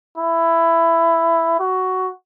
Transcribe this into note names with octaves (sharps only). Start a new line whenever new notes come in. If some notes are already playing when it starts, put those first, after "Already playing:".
E4
F#4